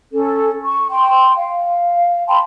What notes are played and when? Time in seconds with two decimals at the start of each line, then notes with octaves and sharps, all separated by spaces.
0.12 C#4 A4
0.64 C#6
0.90 G5 C6
1.37 F5
2.28 G5 A5 B5 C6